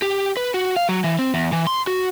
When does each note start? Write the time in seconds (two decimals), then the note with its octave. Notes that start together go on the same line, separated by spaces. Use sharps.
0.02 G4
0.37 B4
0.54 F#4
0.76 F5
0.89 F#3
1.04 E3
1.19 C4
1.34 E2
1.53 E3
1.67 C6
1.87 F#4